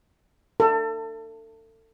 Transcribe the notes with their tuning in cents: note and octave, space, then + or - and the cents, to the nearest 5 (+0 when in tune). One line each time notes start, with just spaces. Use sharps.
A4 +30